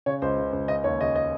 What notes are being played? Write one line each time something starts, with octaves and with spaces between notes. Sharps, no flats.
C#3 C#5
C#2 C5
C#3
C#2
C#3 D#5
D#2 C#5
C#3 D#5
D#5